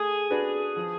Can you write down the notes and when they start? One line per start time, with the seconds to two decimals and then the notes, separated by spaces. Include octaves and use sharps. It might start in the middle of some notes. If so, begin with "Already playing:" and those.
Already playing: A3 G#4
0.30 D4 F#4 B4 D5
0.76 F3